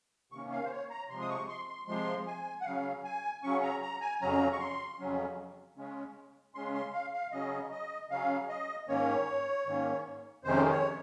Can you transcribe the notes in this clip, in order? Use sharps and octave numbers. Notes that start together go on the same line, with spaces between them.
C3 D#3 A#3 C#4 C#6
F5
C5
C#5
A#5
C3 F3 G#3 C6
D#6
C#6
C6
C6
C3 F3 G#3 C6
G#5
F#5
C#3 F#3 C#4 F5
G#5
C#3 F#3 C#4 C#6
A#5
A#5
G#5
F2 C#3 F#3 C#4 A#5
C#6
C6
F2 C#3 F#3 C#4
C#3 G#3 C#4
C#3 G#3 C#4 C6
C6
F5
F5
C#3 F#3 C#4 D#5
D#5
C#3 F#3 C#4 F5
D#5
G#2 D#3 A#3 C#4 C#5
G#2 D#3 A#3 C#4
F2 C3 D#3 G#3 C#4 C5
C#5